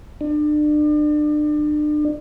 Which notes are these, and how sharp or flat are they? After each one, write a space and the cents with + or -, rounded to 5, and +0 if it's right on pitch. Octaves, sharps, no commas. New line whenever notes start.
D4 +35